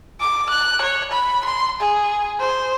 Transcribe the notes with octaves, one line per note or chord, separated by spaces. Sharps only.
D6
F#6
C#5
B5
C6
G#4
C5